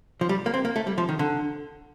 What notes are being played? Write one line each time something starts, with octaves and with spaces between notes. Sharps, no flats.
F3
G3
A#3
C4
A#3
A3
G3
F3
D#3
D3